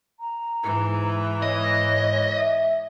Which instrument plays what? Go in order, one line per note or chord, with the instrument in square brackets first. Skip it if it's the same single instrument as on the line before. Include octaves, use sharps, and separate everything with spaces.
[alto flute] A#5
[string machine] G#2 [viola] E3
[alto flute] C#5 [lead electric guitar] D#5
[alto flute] E5